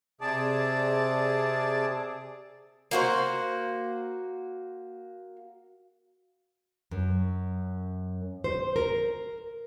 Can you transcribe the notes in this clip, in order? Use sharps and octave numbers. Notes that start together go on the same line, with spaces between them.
C3 G#4 D5 A5
A#3 F#4 C5
F#2
C5
A#4